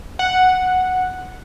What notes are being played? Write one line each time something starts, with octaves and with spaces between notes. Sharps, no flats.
F#5